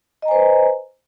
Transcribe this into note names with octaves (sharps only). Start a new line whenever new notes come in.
B4 C5 D#5 G#5 A#5